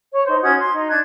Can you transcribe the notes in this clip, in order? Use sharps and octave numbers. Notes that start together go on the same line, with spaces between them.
C#5
D#4 C5
C#4 F#4 D#6 G#6
C6
D#4
D4 F#6 G#6